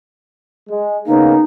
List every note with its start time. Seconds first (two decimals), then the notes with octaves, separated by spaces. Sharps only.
0.68 G#3
1.06 C#3 A#3 B3 D#4